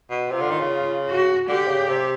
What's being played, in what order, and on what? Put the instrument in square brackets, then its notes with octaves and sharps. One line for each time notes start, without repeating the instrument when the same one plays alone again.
[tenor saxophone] B2
[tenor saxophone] C3 [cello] F4
[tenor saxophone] D3
D#3
C#3
[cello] F#4
[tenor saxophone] D3 [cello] G4
[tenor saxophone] C#3
C3